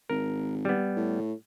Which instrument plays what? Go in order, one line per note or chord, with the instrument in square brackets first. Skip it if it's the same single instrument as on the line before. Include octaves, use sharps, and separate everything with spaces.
[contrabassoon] G#1 [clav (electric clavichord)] A#4
[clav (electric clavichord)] G3 B3
[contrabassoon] A2